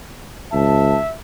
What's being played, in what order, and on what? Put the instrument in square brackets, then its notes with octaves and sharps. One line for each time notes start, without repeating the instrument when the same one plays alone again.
[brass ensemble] C#2 A5 [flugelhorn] E5